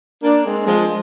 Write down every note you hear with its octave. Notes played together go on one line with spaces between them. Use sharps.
A#3 D4
G#3 C4
F3 G#3